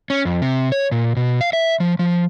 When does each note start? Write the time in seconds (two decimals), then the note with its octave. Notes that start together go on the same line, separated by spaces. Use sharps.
0.10 C#4
0.25 F2
0.42 C3
0.72 C#5
0.92 A#2
1.16 B2
1.41 F5
1.53 E5
1.80 F3
1.99 F3